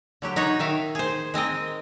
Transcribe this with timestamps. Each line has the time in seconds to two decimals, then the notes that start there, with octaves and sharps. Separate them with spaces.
0.22 D3 F#3 G4
0.36 D#4 F#4 C#5
0.59 D#3 E5 F5
0.95 G#4 C5
1.34 G#3 C4 A#4 D#5